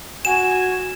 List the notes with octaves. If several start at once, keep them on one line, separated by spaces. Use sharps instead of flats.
F#4 G#5 E7